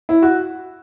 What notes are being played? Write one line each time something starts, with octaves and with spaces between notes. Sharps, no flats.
E4
F#4